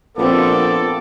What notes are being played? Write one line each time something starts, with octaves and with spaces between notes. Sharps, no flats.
A#1 B3 C4 F4 A4 D6